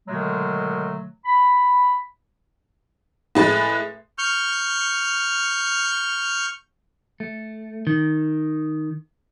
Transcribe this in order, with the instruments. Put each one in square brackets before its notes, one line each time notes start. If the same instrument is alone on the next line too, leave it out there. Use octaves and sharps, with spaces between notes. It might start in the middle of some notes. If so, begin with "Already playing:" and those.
[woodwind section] B2 D3 D#3 F#3 G#3 A3
B5
[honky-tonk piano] A2 G#3 B4 A6
[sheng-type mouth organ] C#6 F6 G6
[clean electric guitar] A3
D#3